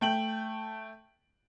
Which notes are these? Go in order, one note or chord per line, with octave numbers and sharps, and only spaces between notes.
A3 G5 F#7